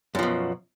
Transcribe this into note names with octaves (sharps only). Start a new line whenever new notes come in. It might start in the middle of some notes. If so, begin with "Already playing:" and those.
F#2 B2 F3